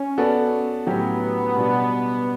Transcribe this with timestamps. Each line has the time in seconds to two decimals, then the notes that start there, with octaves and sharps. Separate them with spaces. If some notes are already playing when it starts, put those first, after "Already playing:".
Already playing: C#4
0.18 B3 F#4 A4 D5
0.87 A2 F#3 B3 C#4 G4
1.56 B2 G3 D4 F#4